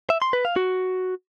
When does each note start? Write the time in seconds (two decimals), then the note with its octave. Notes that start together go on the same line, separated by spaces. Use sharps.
0.10 E5
0.22 C6
0.33 B4
0.45 F5
0.56 F#4